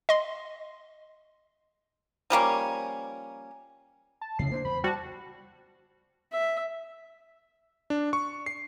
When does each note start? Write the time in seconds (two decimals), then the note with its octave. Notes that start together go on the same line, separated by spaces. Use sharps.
0.09 D#5 C6
2.30 F3 G3 A#3 C#4
4.21 A5
4.39 F2 A2 C#3 C7
4.52 A#3 B3 D4 C5
4.65 E2 B5
4.84 G3 F#4 C5 A5
6.33 E5
7.90 D4
8.13 C#6
8.46 C7